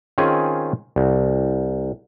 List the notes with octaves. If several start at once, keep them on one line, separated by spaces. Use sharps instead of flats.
D#3 C4 C#4 F4 G#4
C2